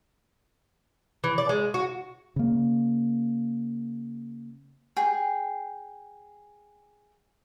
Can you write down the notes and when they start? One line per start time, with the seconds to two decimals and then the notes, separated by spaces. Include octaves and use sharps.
1.24 E3
1.38 D5
1.49 G#3
1.74 F#4
2.36 C#3 A#3
4.97 G#4 G5